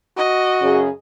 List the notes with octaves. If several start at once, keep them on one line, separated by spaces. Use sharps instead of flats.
F#4 D#5
F#2 C#3 G#4